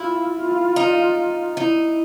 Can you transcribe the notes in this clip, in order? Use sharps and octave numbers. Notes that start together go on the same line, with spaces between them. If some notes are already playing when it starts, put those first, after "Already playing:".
Already playing: E4 F4
F4
D#4
D#4 E4